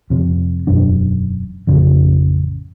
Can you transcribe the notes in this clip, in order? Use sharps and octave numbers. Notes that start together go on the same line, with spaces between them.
F2 C3
E1 F#2 D4
A1 F2 C#3